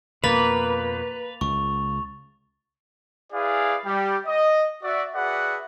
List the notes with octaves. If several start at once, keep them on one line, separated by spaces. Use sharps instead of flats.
F2 B2 A#3 B4 A6 F7
C#2 C#6
E4 G#4 B4 D5 F5 G#5
G3 G4
D#5
F#4 D5 E5
F#4 G#4 B4 D5 E5 F#5